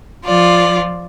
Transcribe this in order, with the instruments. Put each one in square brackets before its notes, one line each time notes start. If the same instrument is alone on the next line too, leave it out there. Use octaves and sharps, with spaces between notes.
[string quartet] F3 F4 D5